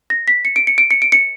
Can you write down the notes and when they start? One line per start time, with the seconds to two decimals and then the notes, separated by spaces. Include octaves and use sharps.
0.10 A#6
0.28 B6
0.45 C#7
0.56 D7
0.67 C#7
0.78 D7
0.91 C#7
1.02 D7
1.12 C#7